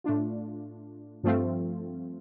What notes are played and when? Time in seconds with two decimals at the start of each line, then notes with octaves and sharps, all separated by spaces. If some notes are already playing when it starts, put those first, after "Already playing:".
0.04 A2 A3 D4 F4
1.23 G2 F3 A3 C4 F4